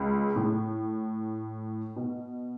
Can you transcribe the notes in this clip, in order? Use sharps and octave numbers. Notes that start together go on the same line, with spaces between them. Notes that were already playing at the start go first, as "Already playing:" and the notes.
Already playing: C#2 C#3
A2
B2